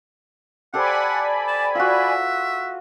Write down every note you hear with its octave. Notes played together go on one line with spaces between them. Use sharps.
G4 A4 C5 D5 F#5 G#5 B5
A5
F4 F#4 E5